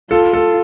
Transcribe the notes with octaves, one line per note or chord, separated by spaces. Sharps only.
F4 A4
A4